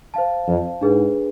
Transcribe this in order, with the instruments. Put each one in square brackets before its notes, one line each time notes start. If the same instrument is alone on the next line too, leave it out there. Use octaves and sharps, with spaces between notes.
[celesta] C5 F5 A5
[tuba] F2
[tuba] G#2 [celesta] D4 G#4 B4